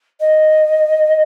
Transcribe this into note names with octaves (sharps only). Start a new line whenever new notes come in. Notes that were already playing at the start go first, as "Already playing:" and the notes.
D#5